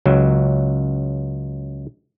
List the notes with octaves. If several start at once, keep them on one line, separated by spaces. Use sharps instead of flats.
C#2 F#3